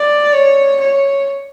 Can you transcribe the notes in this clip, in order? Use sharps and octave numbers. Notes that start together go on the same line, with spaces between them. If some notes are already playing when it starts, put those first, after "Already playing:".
Already playing: D5
C#5
C#5